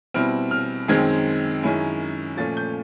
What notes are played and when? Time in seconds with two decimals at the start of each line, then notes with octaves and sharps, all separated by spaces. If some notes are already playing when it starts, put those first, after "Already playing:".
0.14 B2 G3 C4 E4 F6
0.51 F6
0.88 F#2 D#3 G#3 C4 G#6
1.63 F#2 D#3 G#3 C#4 E4
2.37 A#2 F3 A3 C#4 A6
2.57 G6